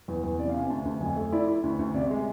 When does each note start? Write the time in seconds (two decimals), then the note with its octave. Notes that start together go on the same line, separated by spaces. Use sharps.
0.08 E2
0.23 E2
0.39 C3 D5
0.49 F5
0.54 C3
0.60 G#5
0.70 D2 A5
0.85 D2
1.01 F2 G#5
1.16 A3
1.32 E4 D5
1.48 E4
1.64 D2
1.79 D2
1.94 C3 D5
2.11 G#3